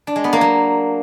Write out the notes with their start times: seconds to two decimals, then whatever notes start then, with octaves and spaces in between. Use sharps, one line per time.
0.07 D4
0.16 G#3
0.24 B3
0.33 A#3
0.41 F#3